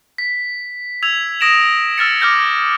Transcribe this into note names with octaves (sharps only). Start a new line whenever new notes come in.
B6
E6 G#6 F7
D#6 A#6 D7 E7 F#7
E6 F6 A6 C#7
D6 F6 G6 A#6